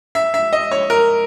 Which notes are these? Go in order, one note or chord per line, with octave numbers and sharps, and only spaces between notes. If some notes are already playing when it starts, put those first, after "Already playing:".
E5
E5
D#5
C#5
A#4